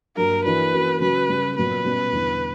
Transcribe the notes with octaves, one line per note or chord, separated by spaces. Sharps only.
G2 F#3 A#3 A#4
E3 A#3 D4 F#4 B4
E3 A#3 C#4 F#4
C#3 F#3 C#4 F#4 B4
C#3 G3 C#4
A#2 F#3 B3 B4
B2 G3 C#4
E2 D3 G3